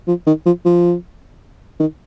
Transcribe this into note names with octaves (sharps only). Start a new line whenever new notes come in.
F3
D#3
F3
F3
D#3